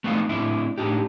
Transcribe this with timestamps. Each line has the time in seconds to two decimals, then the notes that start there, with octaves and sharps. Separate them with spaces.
0.04 A3 B3 C4 D#4 F5
0.29 A2 C4 D4 E4
0.78 A2 D4 D#4 G4